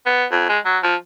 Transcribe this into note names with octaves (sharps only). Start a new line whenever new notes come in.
B3
F2
G#3
F#3
F3